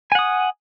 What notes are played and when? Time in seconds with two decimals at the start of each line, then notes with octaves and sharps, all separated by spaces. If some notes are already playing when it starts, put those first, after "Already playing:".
0.12 G#5
0.15 F#5
0.19 D#6